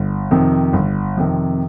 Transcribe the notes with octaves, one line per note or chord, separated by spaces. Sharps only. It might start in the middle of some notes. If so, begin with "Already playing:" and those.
Already playing: G1
F2 C3 D#3
G1
F2 C3 D#3